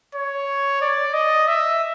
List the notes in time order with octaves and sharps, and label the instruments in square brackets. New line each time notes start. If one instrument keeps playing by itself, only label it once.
[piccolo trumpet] C#5
D5
D#5
E5